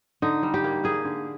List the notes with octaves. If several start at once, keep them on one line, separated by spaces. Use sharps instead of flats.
D3 D#4
G3
G4
A#3
A#3 G#4
D3